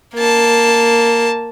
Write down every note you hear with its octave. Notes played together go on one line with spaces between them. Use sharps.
A#3 A5